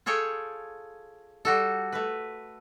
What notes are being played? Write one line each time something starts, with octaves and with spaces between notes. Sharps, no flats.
F4 G#4 A4 C#5 G5
G3 F#4 A4
A3 B4